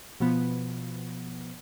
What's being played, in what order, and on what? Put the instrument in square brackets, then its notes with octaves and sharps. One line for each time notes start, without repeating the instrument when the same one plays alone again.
[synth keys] B2 F3 B3